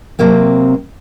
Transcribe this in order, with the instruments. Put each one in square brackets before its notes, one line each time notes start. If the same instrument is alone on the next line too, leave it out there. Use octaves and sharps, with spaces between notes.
[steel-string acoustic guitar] C3 F#3 A#3 C4